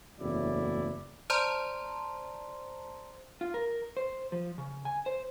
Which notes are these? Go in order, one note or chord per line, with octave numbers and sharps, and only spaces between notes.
F#1 E2 A2 F#3 E4 D5
C5 D5 A5 A#5 C6
F4
A#4
C5
F3
C#3
G#5
C5